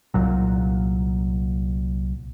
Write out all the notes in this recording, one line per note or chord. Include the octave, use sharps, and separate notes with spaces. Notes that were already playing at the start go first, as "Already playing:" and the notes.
C2 A#2 F#3